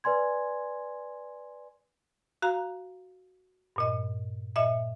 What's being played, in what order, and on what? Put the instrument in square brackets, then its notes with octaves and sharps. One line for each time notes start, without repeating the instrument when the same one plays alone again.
[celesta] B4 D5 G#5 C6 G#6
[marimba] F#4 F5 A#5
G2 A#2 D#5
A#2 D#5 E5